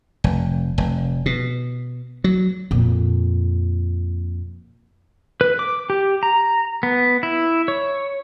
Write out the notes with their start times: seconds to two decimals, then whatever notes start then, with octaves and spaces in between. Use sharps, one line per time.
0.24 F1
0.78 F1
1.26 B2
2.24 F#3
2.71 F2 A#2
5.41 B4
5.59 D6
5.90 G4
6.23 A#5
6.83 B3
7.23 E4
7.68 C#5